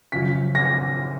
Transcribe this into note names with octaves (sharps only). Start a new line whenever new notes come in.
F#2 C#3 F3 B6
A#6